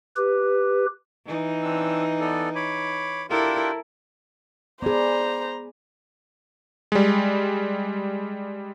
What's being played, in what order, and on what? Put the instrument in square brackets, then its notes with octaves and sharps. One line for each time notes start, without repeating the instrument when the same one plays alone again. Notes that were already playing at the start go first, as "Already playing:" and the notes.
[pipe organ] G4 B4
[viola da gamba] E3 D#4
[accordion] C4 D4 E6
B3 A4 D5
C#5 B5 D6
[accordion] D4 F4 G4 [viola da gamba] E4 A4 A#4
[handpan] B3 G#4 [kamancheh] C5 A#5 [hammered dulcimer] D5 G#5 B5
[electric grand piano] G3 G#3